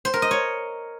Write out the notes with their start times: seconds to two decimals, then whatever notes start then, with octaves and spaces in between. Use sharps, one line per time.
0.05 C5
0.14 A#4
0.22 D#5
0.31 C#5